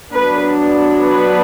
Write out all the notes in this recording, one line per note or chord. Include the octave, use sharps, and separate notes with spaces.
F#3 B3 D4 B4
B4